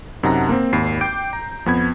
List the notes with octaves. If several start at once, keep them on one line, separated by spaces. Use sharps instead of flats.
F#2 C3 D#4 F#5 A5 A#5
A#3 C4
G#1 D#2 B5 C7
G5 D6 G6 D7
A#5
F2 B3 B5 G#6